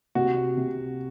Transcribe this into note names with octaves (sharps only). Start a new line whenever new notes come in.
C3 F#4
C3